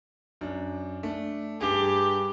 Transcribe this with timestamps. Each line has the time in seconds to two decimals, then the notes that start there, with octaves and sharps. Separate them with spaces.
0.41 F#2 D4
1.03 A3 D4
1.61 G2 G4 G#4